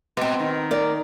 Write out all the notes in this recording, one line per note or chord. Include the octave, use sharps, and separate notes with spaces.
B2 B3 C4
D#3
A#4 D5